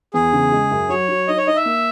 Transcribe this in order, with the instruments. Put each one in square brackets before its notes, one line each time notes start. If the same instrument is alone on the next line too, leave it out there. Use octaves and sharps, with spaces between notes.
[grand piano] E2 [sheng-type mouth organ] G#4
[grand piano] C#3
G#3
F#2
[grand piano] F#3 [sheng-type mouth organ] C#5
[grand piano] F#3
[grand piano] D#4 [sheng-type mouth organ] D#5
[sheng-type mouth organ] C#5
[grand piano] D#4 [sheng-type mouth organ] D#5
[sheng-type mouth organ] E5
[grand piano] A#3